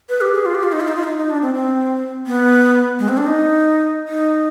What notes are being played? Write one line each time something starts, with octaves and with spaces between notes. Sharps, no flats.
B4
G4
G#4
F4
G4
F4
D#4
F4
D#4
F4
D#4
D#4
D4
C4
C4
B3
G#3
C4
D4
D#4
D#4